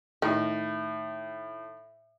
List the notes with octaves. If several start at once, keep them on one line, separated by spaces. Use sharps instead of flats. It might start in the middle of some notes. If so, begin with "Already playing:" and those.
A2 D#3